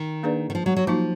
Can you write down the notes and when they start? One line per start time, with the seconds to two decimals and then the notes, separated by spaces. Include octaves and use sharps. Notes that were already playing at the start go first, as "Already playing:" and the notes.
Already playing: D#3
0.23 A#3 D4 G#4 B4 D5
0.50 D#3
0.55 F3
0.66 F#3
0.77 F#3
0.87 F3 F#3 A#3 D#4 F#4